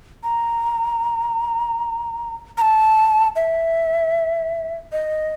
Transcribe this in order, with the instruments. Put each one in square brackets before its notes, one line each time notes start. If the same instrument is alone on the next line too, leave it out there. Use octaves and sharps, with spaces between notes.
[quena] A#5
A#5
A5
E5
D#5